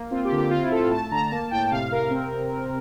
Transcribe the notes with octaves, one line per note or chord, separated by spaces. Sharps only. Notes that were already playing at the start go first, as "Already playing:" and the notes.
Already playing: A#3
C4 F4
G4
D3
G4
C4 F4
E4
A2 A4
A3 A5
D3 A#5
A#5
A#3 A5
A2 G5
C3 F5
C3 A#4
C4